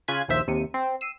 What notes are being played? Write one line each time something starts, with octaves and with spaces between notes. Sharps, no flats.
C#3 F4 G#5 F#6 G#6 B6
A#1 D#2 C5 E5 B6
D#2 C3 C#7 D#7
C4
E6 C7 D#7